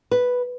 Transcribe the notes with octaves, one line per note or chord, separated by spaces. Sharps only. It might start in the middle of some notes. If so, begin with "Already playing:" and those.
B4